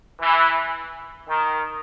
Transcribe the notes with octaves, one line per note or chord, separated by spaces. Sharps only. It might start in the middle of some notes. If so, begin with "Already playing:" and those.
E3
D#3